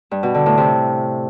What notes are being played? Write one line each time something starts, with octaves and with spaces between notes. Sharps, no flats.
G2
B2
D3
A2
C3